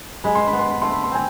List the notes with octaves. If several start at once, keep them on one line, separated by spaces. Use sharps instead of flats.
G#3 B5
C6
B5
B3
C6
B5
A3 C6
B5
C6
C4 G#5